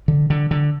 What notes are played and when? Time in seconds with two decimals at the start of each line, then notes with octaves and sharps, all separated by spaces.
0.08 D3
0.30 D3
0.51 D3